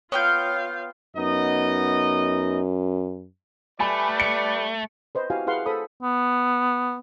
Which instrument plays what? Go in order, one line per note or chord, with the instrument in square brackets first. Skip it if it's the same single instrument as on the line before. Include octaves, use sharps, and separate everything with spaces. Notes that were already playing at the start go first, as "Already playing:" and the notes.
[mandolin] B3 G5 F6 [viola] F4 F5 [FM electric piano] C#5 G6
[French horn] F#2 [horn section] B3 D#4 D#5
[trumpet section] G3 B4 D5 [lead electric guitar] A3 [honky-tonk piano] G#5 B5
[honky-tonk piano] C#7
[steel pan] B4 C5 D#5
E4 F#4 G4 F5 G#5
E4 G#4 B4 F5 F#5 C6
A4 C5 B5 D#6
[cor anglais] B3